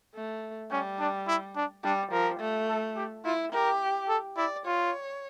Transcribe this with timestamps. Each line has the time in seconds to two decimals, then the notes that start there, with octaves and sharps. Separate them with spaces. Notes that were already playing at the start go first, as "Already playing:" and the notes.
0.15 A3
0.71 G3 C#4
0.99 D4
1.27 E4
1.56 D4
1.84 G3 D4
2.12 F3 A#4
2.40 A3
2.68 A4
2.96 G4
3.25 E4 F4
3.53 G4 A#4
4.09 A4
4.37 E4 D5
4.66 F4 C#5